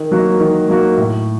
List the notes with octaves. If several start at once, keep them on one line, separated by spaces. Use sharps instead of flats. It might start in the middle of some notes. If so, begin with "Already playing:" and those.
Already playing: D#3
F#3 A#3 F#4
D#3
F#3 A#3 F#4
A2